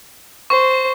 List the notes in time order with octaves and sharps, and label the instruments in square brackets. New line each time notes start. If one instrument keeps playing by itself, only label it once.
[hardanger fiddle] C5 [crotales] C#6